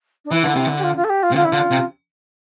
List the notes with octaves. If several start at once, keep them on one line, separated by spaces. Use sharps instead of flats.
D4
E3 E4
D3
C3
D3
G4
F4
F4
A4
G4
F4
C3
D3 F4
E4
D3 F4
C3